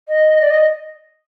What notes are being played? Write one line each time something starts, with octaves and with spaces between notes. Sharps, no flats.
D#5
D5
D#5